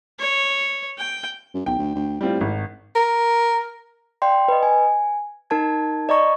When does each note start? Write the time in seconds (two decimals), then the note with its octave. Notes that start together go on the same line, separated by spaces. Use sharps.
0.19 C#5
0.98 G5
1.54 F#2
1.66 B1 G5
1.79 D2
1.95 D2
2.21 A2 G3 C4 F4
2.41 G#1
2.96 A#4
4.22 D5 F5 G5 C6
4.48 B4 D#5
4.63 G#5
5.50 D#4 A#4 A5 G#6
6.09 D5 D#5 A#5 C#6